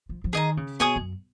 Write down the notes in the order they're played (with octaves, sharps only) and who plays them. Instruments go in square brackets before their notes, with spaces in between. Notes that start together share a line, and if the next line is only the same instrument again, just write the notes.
[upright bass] F3
F3
[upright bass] D#3 [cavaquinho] G#4 D#5 A#5
[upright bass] C#3
[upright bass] B2 [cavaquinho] G#4 C#5 G#5 D#6
[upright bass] F#2